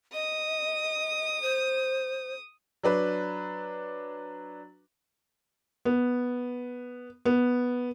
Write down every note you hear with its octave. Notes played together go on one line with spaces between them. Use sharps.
D#5 D#6
C5
F#3 D4 B4
B3
B3